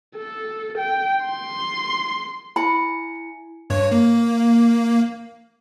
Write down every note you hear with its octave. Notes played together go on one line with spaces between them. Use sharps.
A4
G5
C6
E4 G#5 B5 C#7
G2 C#5
A#3